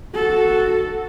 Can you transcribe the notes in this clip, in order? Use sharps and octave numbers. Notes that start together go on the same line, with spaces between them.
F#4 A4